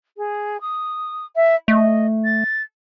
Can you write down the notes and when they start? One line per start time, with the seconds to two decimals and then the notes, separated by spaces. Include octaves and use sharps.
0.17 G#4
0.61 D#6
1.36 E5
1.68 A3 D#5
2.24 A6